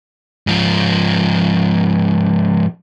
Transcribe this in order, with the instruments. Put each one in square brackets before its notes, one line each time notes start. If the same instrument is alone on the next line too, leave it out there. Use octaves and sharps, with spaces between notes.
[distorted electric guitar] G#2 F3